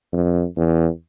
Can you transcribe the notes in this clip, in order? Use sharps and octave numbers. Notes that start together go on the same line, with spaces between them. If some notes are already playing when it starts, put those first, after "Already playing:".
F2
E2